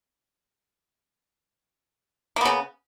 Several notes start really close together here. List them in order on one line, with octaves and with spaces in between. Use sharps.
A#3 B3 C#3